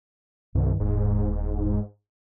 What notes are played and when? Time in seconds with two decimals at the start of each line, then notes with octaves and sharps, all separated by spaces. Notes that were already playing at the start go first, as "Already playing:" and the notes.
0.55 C2 G2 D#3
0.80 D#1 G#2